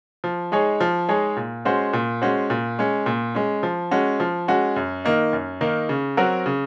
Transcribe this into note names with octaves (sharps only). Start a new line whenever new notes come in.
F3
G#3 D#4 G#4 C#5
F3
G#3 D#4 G#4 C#5
A#2
G#3 C#4 F#4 C5
A#2
G#3 C#4 F#4 C5
A#2
G#3 C#4
A#2
G#3 C#4
F3
G#3 C#4 F#4
F3
G#3 C#4 F#4
F#2
D#3 A#3 D#4
F#2
D#3 A#3 D#4
C#3
F#3 C4 F#4 A#4
C#3